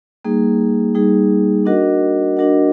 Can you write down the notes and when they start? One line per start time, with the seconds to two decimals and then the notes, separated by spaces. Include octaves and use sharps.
0.25 G3 A#3 D#4 G#4
0.95 G3 A#3 D#4 G#4
1.66 D4 F#4 A#4 D#5 F#5
2.37 D4 F#4 A#4 D#5 F#5